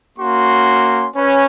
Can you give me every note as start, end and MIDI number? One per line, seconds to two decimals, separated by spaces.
0.19 1.08 58
0.19 1.08 61
0.19 1.08 66
0.19 1.08 84
1.16 1.46 61
1.16 1.46 71